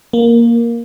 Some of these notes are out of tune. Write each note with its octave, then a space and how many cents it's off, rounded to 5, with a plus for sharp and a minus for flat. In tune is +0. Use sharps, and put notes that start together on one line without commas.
A#3 +5